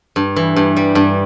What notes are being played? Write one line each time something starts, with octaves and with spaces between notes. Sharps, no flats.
G2
E3
G2
G3
G2